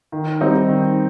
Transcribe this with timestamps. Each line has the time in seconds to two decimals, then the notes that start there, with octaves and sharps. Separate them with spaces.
0.12 D#3
0.41 G3 C4 D#4
0.69 D#3